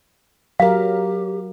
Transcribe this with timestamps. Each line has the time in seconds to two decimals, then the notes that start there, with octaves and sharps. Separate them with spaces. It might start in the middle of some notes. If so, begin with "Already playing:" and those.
0.60 F#3 G4 A#4 F5